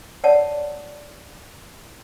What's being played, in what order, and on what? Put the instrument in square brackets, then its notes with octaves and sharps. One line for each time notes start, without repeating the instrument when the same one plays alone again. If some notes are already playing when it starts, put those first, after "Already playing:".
[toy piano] C#5 D5 F#5 A5